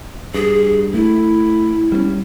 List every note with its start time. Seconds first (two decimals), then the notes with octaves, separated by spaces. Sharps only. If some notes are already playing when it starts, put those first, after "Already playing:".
0.34 G2 G#4
0.94 A3 E4
1.92 G3 B3 C#4